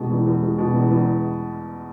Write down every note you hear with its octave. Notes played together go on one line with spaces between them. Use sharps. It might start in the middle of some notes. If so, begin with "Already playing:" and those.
Already playing: E2 B2 G#3
E2
E2
G#3
B2
E2
E2